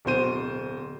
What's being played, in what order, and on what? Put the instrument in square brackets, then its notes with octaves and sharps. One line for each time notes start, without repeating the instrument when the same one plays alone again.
[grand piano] D1 B2 C5 D#7